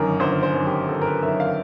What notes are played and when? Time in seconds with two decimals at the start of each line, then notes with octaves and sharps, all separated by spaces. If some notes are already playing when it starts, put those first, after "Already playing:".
Already playing: G1 F#2 D#3 A#4
0.20 G1 C5
0.43 C5
0.54 F#2 D#3
0.66 G4
0.89 G1 A4
1.02 A#4
1.06 B4
1.23 F#2 D#3 E5
1.40 F5